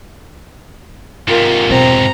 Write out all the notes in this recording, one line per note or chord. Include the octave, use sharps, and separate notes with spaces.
G#2 C3 F4 A#4
E2 B2 C4 A#5